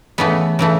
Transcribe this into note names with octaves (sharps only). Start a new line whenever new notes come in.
C#3 E3 A3 B3
C#3 E3 A3